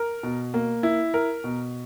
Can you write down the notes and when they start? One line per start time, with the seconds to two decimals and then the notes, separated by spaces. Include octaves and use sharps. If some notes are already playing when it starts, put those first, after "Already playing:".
Already playing: A#4
0.23 B2
0.54 A#3
0.83 E4
1.14 A#4
1.44 B2